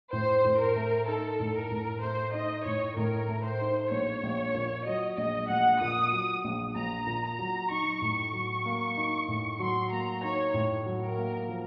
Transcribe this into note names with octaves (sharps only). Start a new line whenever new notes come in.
A2 C5
A2
A#4
A3
D#4 A4
A2
A#4
A2
A3 C5
D#4 D#5
A2 C#5
A2 A#4
A3
C5
D#4
A#1 C#5
A#1
A#2
F#3 D#5
A#1 D#5
A#1 F#5
A#2 D#6
F#3
A#1
A#1 A#5
A#2
A#5
F#3
D#4 C#6
A2
C#6
F#3
A#3
D#4
A2
F#3 C6
A#3 A#5
D#4 C#5
A2
F#3
A#4
A#3
F3